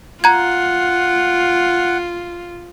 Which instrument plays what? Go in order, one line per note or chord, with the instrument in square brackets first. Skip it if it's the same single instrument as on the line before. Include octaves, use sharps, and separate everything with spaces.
[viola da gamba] F4 [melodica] F#5 [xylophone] A#5 G#6